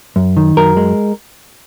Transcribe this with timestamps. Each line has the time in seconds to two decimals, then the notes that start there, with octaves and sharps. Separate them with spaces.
0.16 F#2
0.37 D#3
0.57 F#2 A#4
0.77 G#3